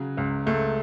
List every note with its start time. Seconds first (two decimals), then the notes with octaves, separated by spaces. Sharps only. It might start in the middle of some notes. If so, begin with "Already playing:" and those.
Already playing: C#3 F#3
0.17 C#2
0.46 C#2 A3